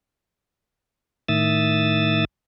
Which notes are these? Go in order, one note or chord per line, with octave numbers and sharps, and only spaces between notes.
A2 D#3 E5 D#6 E6 A6